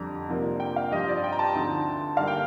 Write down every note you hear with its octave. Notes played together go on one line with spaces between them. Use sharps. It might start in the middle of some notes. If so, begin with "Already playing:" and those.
Already playing: F2 D3 G3 A#5
C3 F3 A#3 D4
G5
F5
G2 F3 C4 D#5
D5
G5
A#5
A5
D2 D3 F3 C4 D#4
G2 D3 G3 A#3 F5
G5